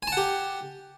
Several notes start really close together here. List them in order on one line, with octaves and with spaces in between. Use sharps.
G#5 A5 F#5 G4